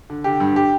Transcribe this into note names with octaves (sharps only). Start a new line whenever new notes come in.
D3
D3 G4
G2
G4